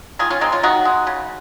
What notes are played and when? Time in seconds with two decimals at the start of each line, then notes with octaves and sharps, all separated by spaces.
0.19 D#3 F4 G#4
0.30 C#4 F4
0.41 G#3 C4 D#4
0.52 C#4 F4
0.63 D#3 D#4 F#4
0.85 G#3
1.07 C#3